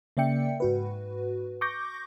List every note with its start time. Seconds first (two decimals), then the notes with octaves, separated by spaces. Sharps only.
0.17 C#3 A#3 D5 E5 G5 C#7
0.60 G#2 F#4 B4
1.61 C#6 D6 G6 A#6